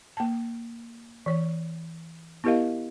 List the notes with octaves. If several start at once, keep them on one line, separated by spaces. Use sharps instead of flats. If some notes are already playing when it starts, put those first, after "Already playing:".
A#3 A5
E3 C#5
B3 E4 G4 A#4 D#5 F5